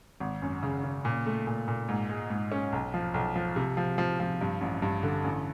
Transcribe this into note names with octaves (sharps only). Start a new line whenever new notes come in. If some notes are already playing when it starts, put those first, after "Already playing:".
G#1
F#2
C#3
C#3
A#2
A3
A#2
A#2
G#2
G#3
G#2
C#4
B1
F3
B1
F3
C3
F3
F3
F3
G2
A1
G2
D3
A1